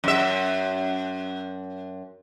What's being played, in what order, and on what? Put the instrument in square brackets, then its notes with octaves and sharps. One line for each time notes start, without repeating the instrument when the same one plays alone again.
[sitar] F#2 E5